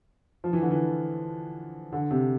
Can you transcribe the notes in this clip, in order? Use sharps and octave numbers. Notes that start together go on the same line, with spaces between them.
F3
E3
D3
E3
D3
C3